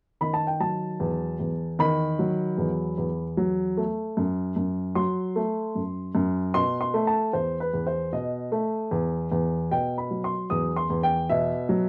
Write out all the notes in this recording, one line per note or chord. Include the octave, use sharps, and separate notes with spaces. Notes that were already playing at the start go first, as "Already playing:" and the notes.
D#3 B5
A5
G5
F#3 A5
E2
E2
D#3 B5
F#3
E2
E2
F#3
A3
F#2
F#2
F#3 C6
A3
F#2
F#2
B2 C6
C6
A3
A5
E2 C5
B4
E2
C5
B2 D#5
A3
E2
E2
B2 G5
B5
F#3
C6
E2 D#6
C6
E2
G5
B2 E5
F#3